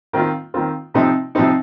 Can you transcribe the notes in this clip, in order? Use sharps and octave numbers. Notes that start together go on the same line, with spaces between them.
D#3 C4 F4
D#3 C4 F4
C3 F3 C4 D#4
C3 F3 C4 D#4